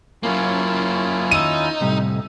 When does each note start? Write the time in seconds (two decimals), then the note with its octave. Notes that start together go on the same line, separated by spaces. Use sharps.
0.23 F#3 A#3 C#4 E4 F4
1.31 D#2 D#4 E6 D#7
1.81 F2 A2 C3 G3